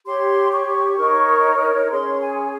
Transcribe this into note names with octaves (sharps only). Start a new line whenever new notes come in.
G4 C#5 C6
C#6
D#4 A#4 C#5
C#4 G#4 C#5 C6
G#5